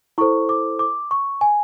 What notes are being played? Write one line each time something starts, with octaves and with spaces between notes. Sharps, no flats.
E4 A4 C5 C#6
D6
D6
C#6
G#5